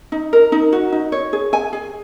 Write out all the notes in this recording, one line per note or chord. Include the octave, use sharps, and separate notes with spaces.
D#4
A#4
D#4
F#4
D#4
C#5
G#4
G#5
G#4